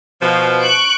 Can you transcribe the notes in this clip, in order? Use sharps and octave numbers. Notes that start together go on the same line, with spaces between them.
B2 F3
C#6 F#6 D7